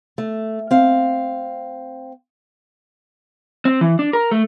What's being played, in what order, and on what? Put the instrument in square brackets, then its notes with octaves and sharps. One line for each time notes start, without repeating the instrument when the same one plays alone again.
[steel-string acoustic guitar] A3
C4 F5
[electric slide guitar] C4
E3
D4
A#4
A3